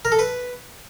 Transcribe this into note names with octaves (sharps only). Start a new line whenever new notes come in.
A#4
A4
B4